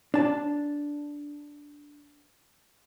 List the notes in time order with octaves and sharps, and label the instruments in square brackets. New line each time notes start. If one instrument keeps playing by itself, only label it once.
[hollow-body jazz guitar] D4 A5